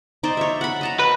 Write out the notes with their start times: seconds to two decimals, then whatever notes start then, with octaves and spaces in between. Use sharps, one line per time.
0.23 D#4 C5 D5
0.37 C#5 E5
0.61 F#5 B5
0.81 D#5 A5 A#5
0.99 B4